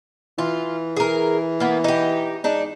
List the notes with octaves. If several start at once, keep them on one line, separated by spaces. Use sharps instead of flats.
E3 F4
G#4 A#4
A#3 B3
D#4 G4
G#2 D4 D#4